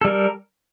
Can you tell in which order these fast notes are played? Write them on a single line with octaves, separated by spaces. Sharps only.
A4 G3 A#4